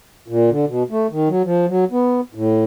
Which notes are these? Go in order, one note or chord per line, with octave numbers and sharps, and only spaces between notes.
A#2
D3
B2
A3
D#3
F#3
F3
F#3
B3
A2